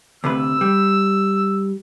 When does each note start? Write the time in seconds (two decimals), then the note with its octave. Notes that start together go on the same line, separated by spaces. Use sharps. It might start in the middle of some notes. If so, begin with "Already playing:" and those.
0.24 D2 C3 B4 E6
0.61 G3